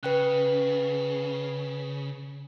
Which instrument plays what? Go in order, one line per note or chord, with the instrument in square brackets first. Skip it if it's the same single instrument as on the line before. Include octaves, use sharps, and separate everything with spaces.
[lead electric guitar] C#3 [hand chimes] B4 G5 F#6